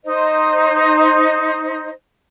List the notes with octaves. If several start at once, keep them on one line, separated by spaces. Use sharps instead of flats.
D#4 C5 D#5